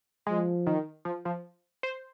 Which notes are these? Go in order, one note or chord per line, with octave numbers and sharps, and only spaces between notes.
F3 G#3
D#3
F3
F3
C5